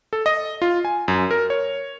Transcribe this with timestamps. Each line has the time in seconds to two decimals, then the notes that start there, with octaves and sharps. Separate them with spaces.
0.13 A4
0.26 D#5
0.62 F4
0.85 G#5
1.08 F#2
1.31 A#4
1.50 C#5